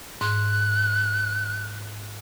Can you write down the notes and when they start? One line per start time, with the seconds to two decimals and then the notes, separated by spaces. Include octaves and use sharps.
0.21 G#2 F#6